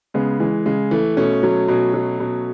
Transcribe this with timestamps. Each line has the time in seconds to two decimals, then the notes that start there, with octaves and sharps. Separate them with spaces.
0.14 C#3 G#3 B3
0.40 E3 G#3
0.66 C#3 G#3
0.91 E3 A3
1.17 B2 A3 C#4
1.43 F#3
1.68 B2
1.94 F#3
2.20 B2